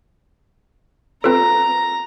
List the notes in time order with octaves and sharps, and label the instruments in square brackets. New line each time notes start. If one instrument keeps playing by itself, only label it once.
[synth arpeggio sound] C4 F4 C#5 [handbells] A4 B4 [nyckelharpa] A#5